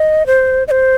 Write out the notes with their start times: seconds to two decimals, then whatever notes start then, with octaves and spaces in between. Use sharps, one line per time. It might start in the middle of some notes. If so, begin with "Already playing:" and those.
Already playing: D#5
0.26 C5
0.68 D#5
0.71 C5